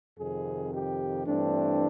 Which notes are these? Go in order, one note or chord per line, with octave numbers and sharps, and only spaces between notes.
F2 C3 D#3 G#4
G4
G2 E3 A3 C4 D4